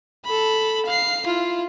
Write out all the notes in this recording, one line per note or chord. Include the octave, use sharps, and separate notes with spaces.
A4 B5
F5 C7
E4 F4